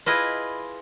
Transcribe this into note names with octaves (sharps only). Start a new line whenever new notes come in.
E4 F4 G#4 B4 D#5